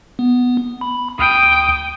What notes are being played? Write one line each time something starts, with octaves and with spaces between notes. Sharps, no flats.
B3
B5
D2 G5 D#6